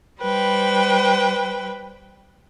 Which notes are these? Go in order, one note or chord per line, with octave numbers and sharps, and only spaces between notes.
G3 B4 C5 G5